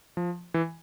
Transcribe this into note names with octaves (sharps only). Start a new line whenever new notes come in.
F3
E3